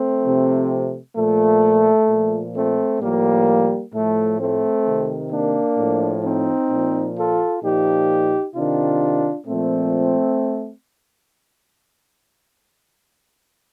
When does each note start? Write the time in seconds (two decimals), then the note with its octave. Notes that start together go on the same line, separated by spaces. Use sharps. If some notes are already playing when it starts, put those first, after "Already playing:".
Already playing: A3 C4
0.23 C3 F3
1.16 A#2 F3 A3
2.08 A#2 F3
2.55 A3 C4
3.01 A2 F3 G3 A#3
3.93 A2 F3 A3
4.39 A3 C4
4.85 C3 D#3
5.32 A#3 D4
5.78 A2 F3
6.24 C4 D#4
6.70 A#2 F3
7.16 F4 A4
7.62 A#2 F3 D#4 G4
8.55 C3 D#3 D4 F4
9.47 A#2 F3 A3 C4